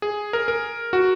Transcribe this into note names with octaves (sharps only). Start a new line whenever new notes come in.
G#4
A#4
A#4
F#4